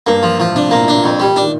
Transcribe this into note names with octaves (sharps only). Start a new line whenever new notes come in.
G2 A#3
F3
A2 F3
C3 D4
A#2 A#3
A2
D4
A#2
F2
G3
D4
D#3